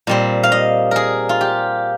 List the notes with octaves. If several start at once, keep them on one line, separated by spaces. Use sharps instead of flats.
A#2 G3 C4
F5
D#5
G#4 A#4
F4
G4